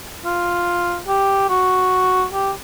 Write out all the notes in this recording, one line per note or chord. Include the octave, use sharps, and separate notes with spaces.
F4
G4
F#4
G4